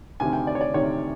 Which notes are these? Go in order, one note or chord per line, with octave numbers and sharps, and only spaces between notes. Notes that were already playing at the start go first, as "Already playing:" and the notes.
D2 C3 D#3 G#5
G5
D5
C#5
D5
D2 C3 D#3 C#5